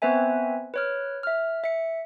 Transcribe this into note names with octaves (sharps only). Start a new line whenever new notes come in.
B3 C4 B4 C5 E5 G#5
B4 C#5 F6
E5 F6
E5 C#7